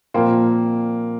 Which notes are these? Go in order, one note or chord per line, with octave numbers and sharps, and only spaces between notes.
A#2 F3 A#3 C4 F4